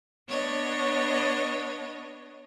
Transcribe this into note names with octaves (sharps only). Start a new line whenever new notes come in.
B3 D4 C#5 D#5